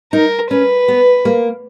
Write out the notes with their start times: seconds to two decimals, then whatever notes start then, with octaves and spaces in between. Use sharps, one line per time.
0.13 D#4 A#4
0.50 C#4 B4
0.88 B3
1.25 A#3